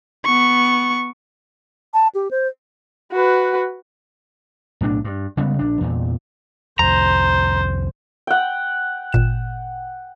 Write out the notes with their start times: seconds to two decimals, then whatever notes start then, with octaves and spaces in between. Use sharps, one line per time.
0.25 B3 C#6
1.94 A5
2.15 G4
2.31 C5
3.12 F#4 B4
4.81 B1 A2 D#3 D4
5.04 G2
5.37 C#3 G3 G#3 B3
5.59 A#1 D4
5.81 E2 A#2
6.79 C2 F2 C5 A#5
8.27 F#5 G5
9.12 G#1 A#2 E7